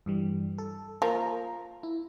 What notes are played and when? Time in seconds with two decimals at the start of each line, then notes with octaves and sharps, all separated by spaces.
0.06 G2 E3 G3
0.58 A4
1.02 F3 A#3 A#4 A#5
1.83 E4